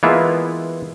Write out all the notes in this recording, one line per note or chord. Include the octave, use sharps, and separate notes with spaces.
E3 G#3 A#3 B3 E4 F4